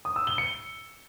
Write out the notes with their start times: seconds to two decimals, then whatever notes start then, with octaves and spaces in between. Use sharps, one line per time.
0.05 D#6
0.16 E6
0.27 G7
0.38 C#7